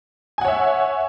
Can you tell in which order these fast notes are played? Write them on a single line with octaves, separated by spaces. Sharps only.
G#5 F#5 C#5 E5